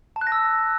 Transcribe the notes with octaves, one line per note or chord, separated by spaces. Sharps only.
A5
F#6
A#6
E6